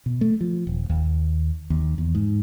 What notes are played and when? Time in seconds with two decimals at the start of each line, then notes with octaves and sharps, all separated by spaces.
0.06 B2
0.21 A3
0.41 F3
0.67 D#1
0.90 D#2
1.70 D#2
1.98 E2
2.15 G#2